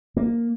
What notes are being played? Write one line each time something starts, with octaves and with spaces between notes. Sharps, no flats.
A#3